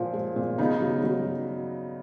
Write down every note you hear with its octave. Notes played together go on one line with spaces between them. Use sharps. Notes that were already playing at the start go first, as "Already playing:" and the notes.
Already playing: A#2 F3 G#3 C#4
G#3
A#2
C#3 B3 D#4
F#3
F#3